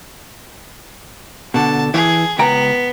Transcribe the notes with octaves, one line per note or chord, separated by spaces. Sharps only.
B2 D3 A5
E3 G#4
C#2 B3 G5 A#5